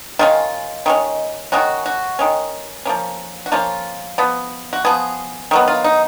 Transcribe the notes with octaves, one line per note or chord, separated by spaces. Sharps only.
D#3 G#3 C#4 F4
D#3 G#3 C#4
D#3 G#3 C#4 F#4
F#4
D#3 G#3 C#4
F3 A#3 C#4
F#4
F3 A#3 C#4 F4
F3 B3
F#4
F3 B3 G#4
D#3 F#3 B3
F4
D#4